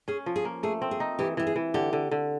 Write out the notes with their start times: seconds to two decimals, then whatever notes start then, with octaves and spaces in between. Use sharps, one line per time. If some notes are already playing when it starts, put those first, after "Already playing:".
0.08 C#4 G#4
0.26 F3
0.36 G#4
0.45 A#3
0.63 A3 G#4
0.82 C4
0.91 G#4
1.00 D#4
1.19 E3 G4
1.37 E3 G4
1.47 G#4
1.56 E3
1.74 D3 G4
1.93 D3
2.11 D3